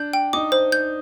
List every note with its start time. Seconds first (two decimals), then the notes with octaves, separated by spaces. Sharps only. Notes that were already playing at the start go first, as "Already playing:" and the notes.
Already playing: D4 G6
0.13 G5
0.33 D#4 D6
0.52 C5
0.72 G6